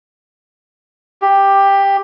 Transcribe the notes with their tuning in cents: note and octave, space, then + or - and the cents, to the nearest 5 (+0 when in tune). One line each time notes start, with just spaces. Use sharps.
G4 +10